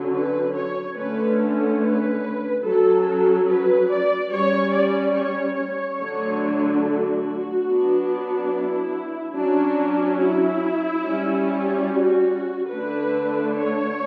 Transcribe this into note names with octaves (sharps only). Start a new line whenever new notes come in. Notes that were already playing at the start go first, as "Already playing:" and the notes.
Already playing: D3 F#3 C#4
B4
C#5
D3 A3 C#4 B4
B4
F#3 C#4 A4
B4
D5
G3 C#4 C#5
D5
C#5
C#5
D3 F#3 A3 D4
F#4
F#3 B3 D4
E4
F#3 C#4 D4
E4
G3 C#4
F#4
D3 A3 D4 B4
C#5